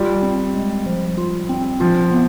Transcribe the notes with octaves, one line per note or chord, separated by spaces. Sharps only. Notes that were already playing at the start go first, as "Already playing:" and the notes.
Already playing: G3 F4
C4
G#3
F3
F4
C4
F3 F4
B3